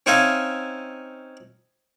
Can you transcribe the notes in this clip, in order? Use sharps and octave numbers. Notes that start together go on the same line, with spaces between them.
C4 C#4 D#4 E5 F5 G#5